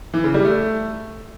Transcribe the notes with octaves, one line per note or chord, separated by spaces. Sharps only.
E3
C#3
G3
A3